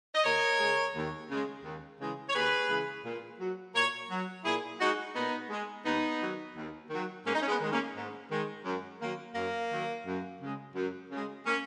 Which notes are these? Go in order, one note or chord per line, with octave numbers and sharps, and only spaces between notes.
D#5
D#2 A#4 C#5
C#3 G#3
D#2
C#3 G#3
D#2
C#3 E3 G#3
C#5
D#2 G#4 B4
C#3 E3 G#3
A#2
F#3
A#2 A#4 C#5
F#3
A#2 E4 G#4
G#3 D#4 F#4
A#2 B3 D#4
G#3
D#2 B3 D#4
D#3 F#3
D#2
D#3 F#3
G#2 A#3 C#4
D#4
C#4
G#3 B3
D#3 G#3
A#3 C#4
G#2
D#3 G#3
F#2
D#3 F#3 A#3
F#2 A#3
D#3 F#3
F#2
C#3 G#3
F#2
C#3 G#3
A#3 C#4